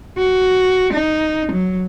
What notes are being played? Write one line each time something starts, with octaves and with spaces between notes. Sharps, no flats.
F#4
D#4
F#3